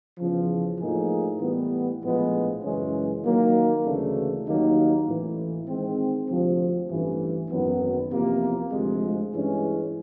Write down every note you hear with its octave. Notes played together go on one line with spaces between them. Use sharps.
E2 C#3 F3
A2 F3 A#3 D#4 G#4
A2 E3 G3 B3
A#1 A2 F3 G#3 B3
F#2 C#3 E3 G#3 C#4
D#3 F#3 A#3
D2 C#3 E3 A3 D4
D#2 D#3 F#3 A#3 D#4
A1 A2 E3
D#3 G#3 C4
D2 C3 F3
A1 G2 E3
G#1 F#2 D#3 F#3 B3
E2 C3 F3 A#3
D2 C3 F3 G#3
G2 E3 G#3 C#4